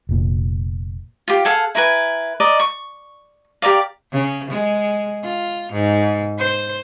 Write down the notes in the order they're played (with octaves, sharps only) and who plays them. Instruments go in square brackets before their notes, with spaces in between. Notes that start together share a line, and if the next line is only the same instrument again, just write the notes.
[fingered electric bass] F1 A#2
[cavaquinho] F4 G4
G#4 A4 F5 F#5
E4 A#4 B4 G#5
A#4 D5 D#5
C#6
G4 A#4 D5 F5
[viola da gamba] C#3
G#3
F4
G#2
C5